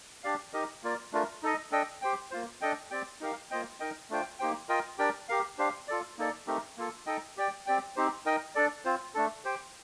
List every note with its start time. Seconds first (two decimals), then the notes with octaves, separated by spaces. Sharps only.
0.24 D4 G4 D5 F5
0.53 D#4 G4 A#4 D#5
0.83 A#3 F4 A#4 D5
1.13 A3 D4 F4 A#4
1.43 D#4 A4 D#5
1.72 D4 A4 D#5 G5
2.02 G4 C5 G5
2.31 A#3 F4 C5
2.61 D4 A4 D#5 G5
2.91 C4 G4 D5 G5
3.20 D#4 G4 A#4 F5
3.51 A#3 F4 C5 D#5 G5
3.80 D#4 A#4 D#5 G5
4.10 A3 D4 F4 C5 G5
4.39 A#3 D#4 G4 C5 G5
4.69 F4 A#4 D#5 G5
4.99 D4 G4 A#4 D5 G5
5.29 G4 A#4 F5
5.58 D4 G4 C5 F5
5.88 F4 A4 D5
6.18 A#3 D#4 A4 D5
6.47 A3 C4 D#4 G4 A#4
6.77 A#3 F4 A4
7.06 D#4 A4 D#5 G5
7.37 G4 D5 G5
7.66 C4 G4 D5 G5
7.96 C4 D#4 G4 C5
8.26 D#4 A#4 D#5 G5
8.55 D4 A4 D5
8.85 C4 F4 C5
9.15 A3 D4 A4
9.45 G4 C5 G5